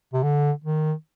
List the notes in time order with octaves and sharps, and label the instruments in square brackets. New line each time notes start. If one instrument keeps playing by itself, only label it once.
[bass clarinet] C3
D3
D#3